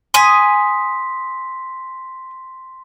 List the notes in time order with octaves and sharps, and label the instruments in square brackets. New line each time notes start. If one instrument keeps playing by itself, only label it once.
[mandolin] G#5 D#6 [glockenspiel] C6 B6